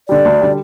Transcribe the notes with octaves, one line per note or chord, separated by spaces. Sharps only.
D3 G3 D5
D2
D3 G3